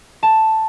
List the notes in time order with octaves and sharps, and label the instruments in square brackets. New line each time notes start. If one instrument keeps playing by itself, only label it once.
[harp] A5